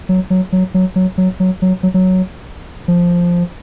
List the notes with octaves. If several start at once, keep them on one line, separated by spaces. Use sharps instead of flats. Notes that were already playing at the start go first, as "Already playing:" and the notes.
F#3
F#3
F#3
F#3
F#3
F#3
F#3
F#3
F#3
F#3
F3